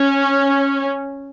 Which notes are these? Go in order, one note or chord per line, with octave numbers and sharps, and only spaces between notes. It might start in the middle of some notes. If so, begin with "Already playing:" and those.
Already playing: C#4